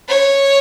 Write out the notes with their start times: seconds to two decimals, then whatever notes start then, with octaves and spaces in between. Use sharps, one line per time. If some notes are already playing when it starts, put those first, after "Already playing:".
0.09 C#5